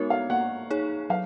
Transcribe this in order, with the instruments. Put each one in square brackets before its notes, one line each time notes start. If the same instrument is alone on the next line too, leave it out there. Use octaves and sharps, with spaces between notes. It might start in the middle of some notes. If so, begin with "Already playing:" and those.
Already playing: [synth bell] G#3 B3 D#4 F#4 A#4 [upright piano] C#5
[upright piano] F5
[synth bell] A#3 [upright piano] F#5
[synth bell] D#4 G#4 C#5
[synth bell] F#3 [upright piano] F5